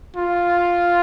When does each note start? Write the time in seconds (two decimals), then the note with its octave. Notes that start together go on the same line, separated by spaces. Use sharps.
0.16 F4